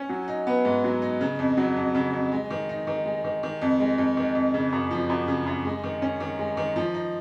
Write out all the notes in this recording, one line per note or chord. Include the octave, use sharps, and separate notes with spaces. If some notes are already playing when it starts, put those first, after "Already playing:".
Already playing: C#4
F#3
D#4
B3
G#2
F#3
D#4
C#3
F2
F#3
F2
C#3
F2
G#3
D#3
D#4
D#3
G#3
D#3
D#3
F2
G#3
F2
D#3
F2
C#3
F#2
F3
F#2
C#3
F#2
G#3
D#3
C#4
D#3
G#3
D#3
F3
D#4